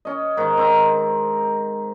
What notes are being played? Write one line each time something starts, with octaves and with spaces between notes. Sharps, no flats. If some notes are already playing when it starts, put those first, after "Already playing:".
C#4 D#5
G#2 D#3 F#5
C4 A#5